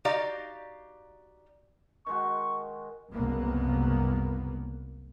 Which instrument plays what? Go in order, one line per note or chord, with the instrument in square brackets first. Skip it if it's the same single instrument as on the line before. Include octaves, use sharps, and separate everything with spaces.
[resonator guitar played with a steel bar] D#4 F#4 G4 D5 D#5 F5
[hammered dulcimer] D#3 G#3 F#4 [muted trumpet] C#6
[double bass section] F#1 C2 A#3 B3